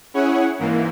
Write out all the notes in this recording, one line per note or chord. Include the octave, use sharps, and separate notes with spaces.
C#4 E4 G#4 C#5 F#5
G#2 E3 A#3